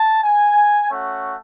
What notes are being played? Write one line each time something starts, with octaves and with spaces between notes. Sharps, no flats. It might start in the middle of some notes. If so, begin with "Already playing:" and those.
Already playing: A5
G#5
A3 C#4 F#4